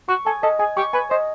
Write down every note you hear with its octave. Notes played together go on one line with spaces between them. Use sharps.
F#4 C#6
A4 G#5
A4 D#5
G#4 G#5
G4 C#6
B4 G#5
C5 D#5